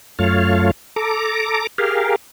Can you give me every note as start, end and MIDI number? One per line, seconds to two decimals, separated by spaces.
0.19 0.71 42
0.19 0.71 57
0.19 0.71 65
0.19 0.71 73
0.19 0.71 77
0.96 1.67 69
0.96 1.67 82
0.96 1.67 86
1.78 2.16 67
1.78 2.16 68
1.78 2.16 70
1.78 2.16 77